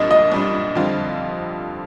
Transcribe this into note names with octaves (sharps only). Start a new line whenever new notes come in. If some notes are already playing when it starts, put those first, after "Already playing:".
Already playing: C2 A#2 G3 D4 D#5
D#5
C2 A#2 G3 D4
F2 D3 G3 C4 F4